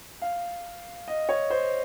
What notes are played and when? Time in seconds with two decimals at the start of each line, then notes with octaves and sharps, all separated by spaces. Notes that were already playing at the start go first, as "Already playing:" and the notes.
0.22 F5
1.08 D#5
1.29 C#5
1.50 C5